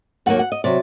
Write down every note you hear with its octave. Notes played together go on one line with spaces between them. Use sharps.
D#2 D#3 F#3 A#3 F#5
F#5
D#5
C3 F#3 D5